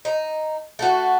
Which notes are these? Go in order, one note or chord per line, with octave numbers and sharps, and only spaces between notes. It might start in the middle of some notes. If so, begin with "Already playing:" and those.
D#4
A3 F#4